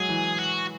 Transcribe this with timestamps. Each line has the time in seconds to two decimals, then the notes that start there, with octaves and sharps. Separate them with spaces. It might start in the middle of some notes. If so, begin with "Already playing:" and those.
Already playing: F#3 G#3 G#4
0.09 E3
0.39 F#4